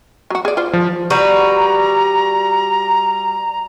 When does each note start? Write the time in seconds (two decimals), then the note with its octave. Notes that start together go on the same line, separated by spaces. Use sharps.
0.30 F#3 F#4
0.45 G#4 D5
0.57 F4 C5
0.73 F3
1.10 G3 F#4 B4 A#5